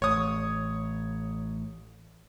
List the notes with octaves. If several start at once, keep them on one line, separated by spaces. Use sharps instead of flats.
A1 C#5 D#6